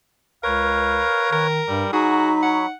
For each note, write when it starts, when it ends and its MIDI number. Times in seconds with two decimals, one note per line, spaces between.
0.44 1.04 37
0.44 1.29 70
0.44 1.47 71
0.44 1.47 73
0.44 1.45 77
1.32 1.61 51
1.32 1.89 70
1.68 1.84 43
1.68 1.88 55
1.93 2.66 54
1.93 2.72 63
1.93 2.33 66
1.93 2.32 68
1.93 2.66 83
2.43 2.64 73
2.43 2.73 78